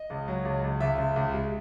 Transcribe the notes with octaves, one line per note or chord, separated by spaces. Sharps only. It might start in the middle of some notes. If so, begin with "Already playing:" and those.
Already playing: D#5
C#2
F#3
C#2
C#2
C#2 E5
C#2
C#2
G#3